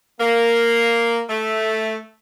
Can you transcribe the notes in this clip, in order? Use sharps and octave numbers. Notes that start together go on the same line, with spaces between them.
A#3
A3